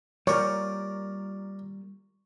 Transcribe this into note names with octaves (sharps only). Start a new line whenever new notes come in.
G3 A#3 F4 A#4 C#5 D5 C#6